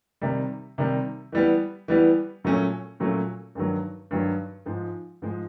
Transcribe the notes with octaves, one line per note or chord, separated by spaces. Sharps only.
C3 D#3 G3
C3 D#3 G3
E3 G3 B3
E3 G3 B3
A#2 F#3 A3 C#4
A#2 F#3 A3 C#4
G2 D#3 F#3
G2 D#3 F#3
G#2 F3 G#3
G#2 F3 G#3